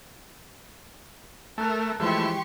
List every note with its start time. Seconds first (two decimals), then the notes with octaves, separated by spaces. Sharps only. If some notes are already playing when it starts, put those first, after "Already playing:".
1.58 A3 A#4 A5 F#6
2.00 E3 F3 G#3 A3 E4 G4 C6 C#6